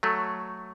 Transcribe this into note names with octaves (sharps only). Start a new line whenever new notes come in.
F#3 A3